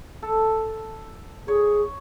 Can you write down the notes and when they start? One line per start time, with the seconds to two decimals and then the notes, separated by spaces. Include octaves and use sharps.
0.22 A4
1.48 G#4 C#5